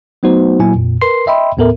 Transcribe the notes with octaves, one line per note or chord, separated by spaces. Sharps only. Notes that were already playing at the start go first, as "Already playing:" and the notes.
F#3 A3 B3 D#4 F#4 C5
A#2 F#3 A#3 E4 G#5
F2 A#2
A#4 B4 C6 C7
D#5 E5 G5 B5 C6
D#2 A2 B3 A4 A#4 E5